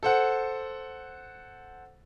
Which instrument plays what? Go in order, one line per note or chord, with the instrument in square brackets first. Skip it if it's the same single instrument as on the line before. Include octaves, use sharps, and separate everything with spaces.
[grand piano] A4 C5 F#5